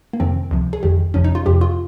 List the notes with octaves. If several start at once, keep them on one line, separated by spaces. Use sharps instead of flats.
A#3
F2 C3 D#3 C4
C#2 C3 F3
G#4
G1 F2 D#3 G4
G1 F2 C3 F3 C#4
D#4
F4
F2 C3 F3 G4
F4